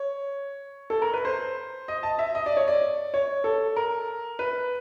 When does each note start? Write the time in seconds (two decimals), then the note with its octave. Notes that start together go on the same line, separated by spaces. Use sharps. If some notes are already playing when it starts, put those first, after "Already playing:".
Already playing: C#5
0.90 A4
1.02 A#4
1.13 B4
1.25 C5
1.88 D#5
2.03 A5
2.19 E5
2.35 D#5
2.46 D5
2.57 C#5
2.68 D5
3.14 C#5
3.44 A4
3.76 A#4
4.39 B4